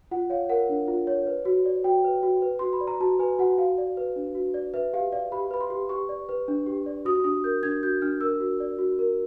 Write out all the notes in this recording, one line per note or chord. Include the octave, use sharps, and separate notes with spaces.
F4 F#5
C#5 F5
A#4 F#5
D4
F4
C#5
B4
F#4
D5
F#4 G5
B4
F#4
B4
F#4 C6
B5
D5
A#5
F#4 A5
B4 G#5
F#4 F#5
F#4 F5
D5
B4
D4
F#4
D5
B4 E5
G4 F5
D5 F5
G4 B5
B4 B5
C6
G4
G4 C#6
D5
B4
D4
G4
D5
F#4 D#6
D4 D#6
A#4 G6
D4 G#6
F#4 G6
D4 F6
A#4 E6
F#4
D5
F#4
A#4